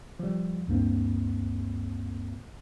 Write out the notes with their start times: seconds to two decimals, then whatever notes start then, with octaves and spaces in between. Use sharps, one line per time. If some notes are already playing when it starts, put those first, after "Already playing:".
0.19 F3 G3
0.68 D2 G2 A#3 C4